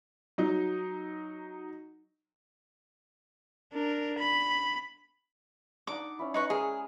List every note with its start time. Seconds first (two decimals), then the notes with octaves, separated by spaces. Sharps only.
0.38 F#3 D#4
3.73 D4 A#4
4.19 B5
5.87 D4 D#4 F#5 D6
6.19 C#4 E4
6.34 D#4 B4 C#6
6.50 G#3 G#4 A#4 D#5